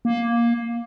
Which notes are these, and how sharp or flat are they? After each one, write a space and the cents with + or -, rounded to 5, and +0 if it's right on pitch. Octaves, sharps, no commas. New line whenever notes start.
A#3 +10